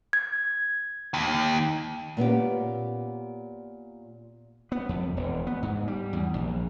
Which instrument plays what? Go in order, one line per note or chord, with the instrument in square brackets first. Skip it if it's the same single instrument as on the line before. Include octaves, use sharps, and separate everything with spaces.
[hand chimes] G#6
[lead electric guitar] D#2
[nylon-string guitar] A#2 B3 C#4 G4
[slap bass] B3
F2
E1
B3
G#2
G3
E2
A#1